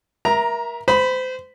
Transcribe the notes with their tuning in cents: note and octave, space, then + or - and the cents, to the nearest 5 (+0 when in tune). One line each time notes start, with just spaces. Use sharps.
A#4 +25 E5 +0 A#5 +0
C5 -30 B5 +0